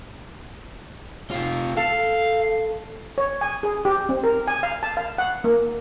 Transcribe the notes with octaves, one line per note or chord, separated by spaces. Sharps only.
C3 F4
A4 F5
C#5
G#5
G#4
G4
C4
A#4
G#5
F5
A5
F5
F#5
A#3